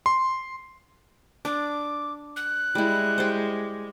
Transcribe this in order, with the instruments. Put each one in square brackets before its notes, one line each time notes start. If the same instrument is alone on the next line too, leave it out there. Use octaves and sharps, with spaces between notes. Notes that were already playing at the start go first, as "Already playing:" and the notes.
[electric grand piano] C6
[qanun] D4 [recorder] D6
[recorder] F#6
[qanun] G3 E4 [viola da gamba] G#3
[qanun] G4 C5